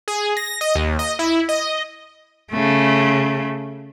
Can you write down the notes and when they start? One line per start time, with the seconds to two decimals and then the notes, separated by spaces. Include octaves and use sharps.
0.08 G#4
0.37 A#6
0.61 D#5
0.75 D#2
0.99 D#5
1.19 E4
1.49 D#5
2.52 C#3 A3